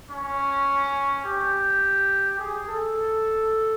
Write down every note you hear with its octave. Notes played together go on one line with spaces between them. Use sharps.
C#4
G4
G#4
A4